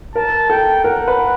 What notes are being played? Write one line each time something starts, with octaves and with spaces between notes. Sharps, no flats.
A#4 A5
A4 G5
A#4 F#5
B4